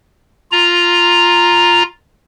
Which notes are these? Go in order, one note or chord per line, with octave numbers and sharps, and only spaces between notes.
F4 A#5